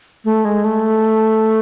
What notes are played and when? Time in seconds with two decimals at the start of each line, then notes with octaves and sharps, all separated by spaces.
0.25 A3
0.45 G#3
0.65 A3